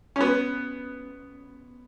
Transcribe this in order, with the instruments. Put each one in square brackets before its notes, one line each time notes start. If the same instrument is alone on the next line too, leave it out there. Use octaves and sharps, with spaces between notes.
[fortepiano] C#4
B3